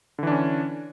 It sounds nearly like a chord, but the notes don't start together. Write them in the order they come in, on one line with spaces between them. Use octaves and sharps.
D3 E3 D4 C#4